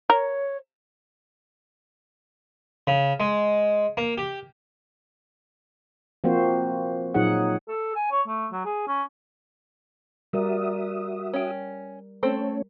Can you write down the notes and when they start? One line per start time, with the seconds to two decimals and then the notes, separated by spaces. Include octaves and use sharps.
0.10 A#4 C#5
2.87 C#3
3.20 G#3
3.97 A#3
4.18 G4
6.24 F3 A#3 C4 F#4 C5
7.14 A#2 F#3 D#4 G#4 F#5
7.68 A4
7.95 G#5
8.11 C#5
8.28 A3
8.52 F#3
8.65 G#4
8.87 C#4
10.33 G3 F#4 A#4 D5 E5 D#6
11.33 C#4 G5
12.23 A3 C4 C#4 A4 C5 C#5